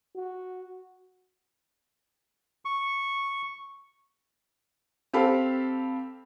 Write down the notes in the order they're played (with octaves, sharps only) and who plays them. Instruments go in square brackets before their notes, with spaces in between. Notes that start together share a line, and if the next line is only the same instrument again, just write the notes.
[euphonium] F#4
[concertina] C#6
[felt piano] C4 G4 A4 F5 B5